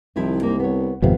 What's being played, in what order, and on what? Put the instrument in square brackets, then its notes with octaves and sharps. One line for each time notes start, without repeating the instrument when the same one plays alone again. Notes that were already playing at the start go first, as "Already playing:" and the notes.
[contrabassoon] C2 [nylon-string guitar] D#3 F3 E4
[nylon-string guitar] A#3 C4 D#4
B3 C#5
[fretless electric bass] G#1 F2 C3 [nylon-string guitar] B3 F5